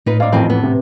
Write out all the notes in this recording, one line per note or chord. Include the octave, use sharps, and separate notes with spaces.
A2 D#4 F4 B4
G#2 D4 F5 D6
A1 F2 D#3 C4
B3
C3